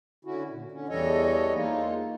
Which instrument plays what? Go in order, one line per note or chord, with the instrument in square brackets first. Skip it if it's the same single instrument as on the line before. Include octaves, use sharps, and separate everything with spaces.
[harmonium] D3 C#4 E4 F#4
A#2
D3 C#4
E2 E3 G3 A4 C#5 D#5
G#3 A#3 D#4 F4